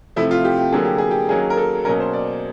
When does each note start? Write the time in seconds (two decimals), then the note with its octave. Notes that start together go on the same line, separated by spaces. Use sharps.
0.16 C3 F3 A3 E4
0.31 F4
0.45 G4
0.59 G4
0.72 D3 F#3 A#3 G#4
0.85 G4
0.98 G#4
1.11 G4
1.29 D#3 F#3 A#3 C#4 G#4
1.50 A#4
1.57 A4
1.85 B2 F#3 A#3 C#4 A#4
2.00 C5
2.13 D5